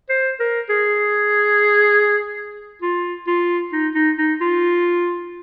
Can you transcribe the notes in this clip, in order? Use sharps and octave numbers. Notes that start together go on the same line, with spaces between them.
C5
A#4
G#4
F4
F4
D#4
D#4
D#4
F4